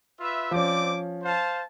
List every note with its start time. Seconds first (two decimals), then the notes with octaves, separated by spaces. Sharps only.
0.20 F4 B4 E5
0.51 F3 C4 C#4 D5 D6
1.24 C5 F5 A5